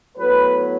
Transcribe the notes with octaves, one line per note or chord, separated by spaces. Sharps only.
A2 F#3 B3 B4